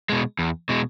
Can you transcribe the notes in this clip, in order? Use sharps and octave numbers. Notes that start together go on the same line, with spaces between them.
B2 G#3
E2
B2 G#3